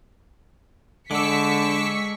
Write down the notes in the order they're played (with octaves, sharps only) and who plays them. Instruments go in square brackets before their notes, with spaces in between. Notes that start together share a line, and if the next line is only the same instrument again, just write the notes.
[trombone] D3 [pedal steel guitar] G#3 [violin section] C#6 B6 C#7 [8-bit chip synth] D6 E6